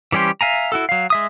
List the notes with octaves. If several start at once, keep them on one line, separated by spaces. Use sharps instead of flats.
E3 G3 C#4 G4 C5
E5 F5 G#5 A#5
E4 F#4 A4
F#3 F5
G#3 E5 D#6